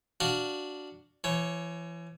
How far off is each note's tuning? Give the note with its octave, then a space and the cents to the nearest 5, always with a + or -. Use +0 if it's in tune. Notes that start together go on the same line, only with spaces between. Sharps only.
D4 +0 F#4 +0 F5 +0
E3 +35 C#5 +0